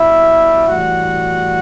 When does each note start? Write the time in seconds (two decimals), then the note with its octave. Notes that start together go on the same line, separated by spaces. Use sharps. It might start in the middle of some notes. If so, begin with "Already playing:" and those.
Already playing: B2 G3 E4 E5
0.67 A2 E3 G3 F#4 F#5